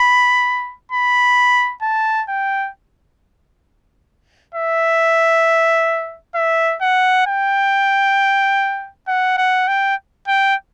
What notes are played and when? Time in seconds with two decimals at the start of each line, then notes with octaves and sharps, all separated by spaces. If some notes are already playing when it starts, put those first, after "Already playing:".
Already playing: B5
0.92 B5
1.82 A5
2.29 G5
4.55 E5
6.35 E5
6.82 F#5
7.27 G5
9.08 F#5
9.38 F#5
9.68 G5
10.28 G5